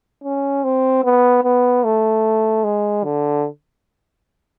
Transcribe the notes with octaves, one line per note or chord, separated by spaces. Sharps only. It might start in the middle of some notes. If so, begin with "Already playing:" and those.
C#4
C4
B3
B3
A3
G#3
D3